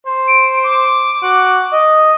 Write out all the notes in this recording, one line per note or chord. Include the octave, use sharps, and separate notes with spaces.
C5
D7
D6
F#4
D#5